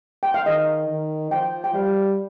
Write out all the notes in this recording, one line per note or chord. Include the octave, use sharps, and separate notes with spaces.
G5
F5
D#3 D#5
D#3
F3 G5
G5
G3 F5